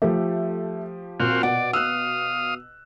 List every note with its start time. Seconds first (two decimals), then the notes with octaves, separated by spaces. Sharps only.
0.02 F3 A3 G4
1.20 A#2 C4 F#4 F5
1.43 B2 D5 F#5
1.73 F5 D#6 E6 F#6